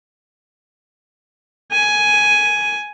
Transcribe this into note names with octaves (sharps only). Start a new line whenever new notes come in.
G#5